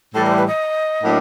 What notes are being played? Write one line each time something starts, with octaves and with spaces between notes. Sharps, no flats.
A2 E3 G3 A4
A#4
C5
B4
D#5
A2 F#3 A#3 D4